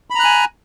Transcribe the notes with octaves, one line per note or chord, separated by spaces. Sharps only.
G#5 A#5 B5 F#6